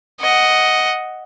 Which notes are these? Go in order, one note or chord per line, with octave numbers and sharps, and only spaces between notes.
D#5 F#5